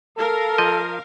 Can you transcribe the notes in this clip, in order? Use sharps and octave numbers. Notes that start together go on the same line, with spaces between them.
A4 A#4 F5
F3 D#5